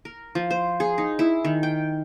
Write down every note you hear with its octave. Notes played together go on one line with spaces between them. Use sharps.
A#4
F3
C5
G#4
D#4
E4
D#3
G5